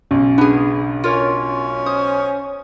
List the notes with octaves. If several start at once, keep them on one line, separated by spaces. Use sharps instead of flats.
B1 C#3 C#4
B3 D4 G#4
C#4 F4 A#4 C#5
C5 D#6